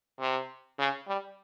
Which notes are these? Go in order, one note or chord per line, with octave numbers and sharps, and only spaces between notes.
C3
C#3
G3